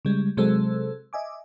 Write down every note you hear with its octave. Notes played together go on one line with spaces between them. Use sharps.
C#3 G3 G#3
C3 F#3 G#3 A4 C5 E6
D#5 E5 G#5 D6